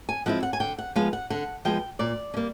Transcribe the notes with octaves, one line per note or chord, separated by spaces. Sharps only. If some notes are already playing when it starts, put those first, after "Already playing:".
G#5
F3 G#3 C4 E4 F#5
F#5
G#5
D3 G5
F#5
F3 G#3 B3 F5
F#5
D3 F#5
F3 G#3 B3 G5
A#2 D5
C#4
G3 A#3